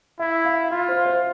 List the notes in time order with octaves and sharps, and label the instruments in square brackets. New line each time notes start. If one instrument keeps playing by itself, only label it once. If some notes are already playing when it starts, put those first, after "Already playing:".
[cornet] E4 [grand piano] E5
[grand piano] F5
[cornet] F4 [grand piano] E5
[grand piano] C5
C5